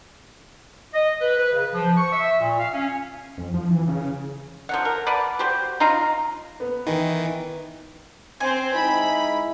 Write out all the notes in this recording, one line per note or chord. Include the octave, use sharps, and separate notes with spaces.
D#5
B4
B4
C#3
F3
C#6
E5
A#2
F5
C#4
F2
F3
E3
C#3
F3 F#3 F#5
A#4
B4 D5 F#5 A5
F#4 G4 C5
D#4 F4 F5 A#5
B3
D#3 E3
C4 C5 G#5
G#3 D#4 E4 B5